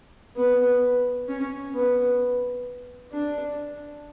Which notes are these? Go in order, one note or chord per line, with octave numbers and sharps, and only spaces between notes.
B3
C#4
B3
D4